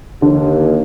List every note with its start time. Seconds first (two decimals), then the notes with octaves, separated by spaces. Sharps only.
0.22 D#2 D3